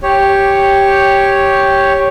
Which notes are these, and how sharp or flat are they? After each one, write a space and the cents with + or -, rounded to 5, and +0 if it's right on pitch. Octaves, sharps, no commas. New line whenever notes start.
G4 +0 C#5 +0